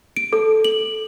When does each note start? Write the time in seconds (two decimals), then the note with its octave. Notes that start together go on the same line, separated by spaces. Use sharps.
0.17 D7
0.33 A4
0.64 F#7